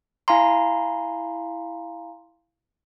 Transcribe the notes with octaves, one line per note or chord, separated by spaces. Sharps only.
E4 F5 G#5 A#5 C6